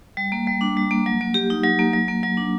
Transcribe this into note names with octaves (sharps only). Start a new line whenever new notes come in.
G3
A#3
G3
D4
G3
A#3
F#3
A#3
G4
D#4
F#3
A#3
F#3
A#3
F#3
D4